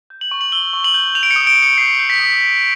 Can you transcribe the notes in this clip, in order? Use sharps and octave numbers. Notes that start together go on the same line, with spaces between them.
G6
F#7
C#6
F#7
E6 G7
C#6
F#7
G6
G6 F7
D7
C#7
D#6
D7
D#6
C#7
G6 C7
G6
B6
D#6